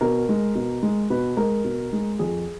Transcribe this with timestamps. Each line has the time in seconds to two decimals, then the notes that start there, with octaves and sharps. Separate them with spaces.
0.01 B2 A#4
0.29 G#3
0.55 B2
0.83 G#3
1.10 B2 B4
1.37 G#3 A#4
1.64 B2
1.93 G#3
2.19 F2 G#4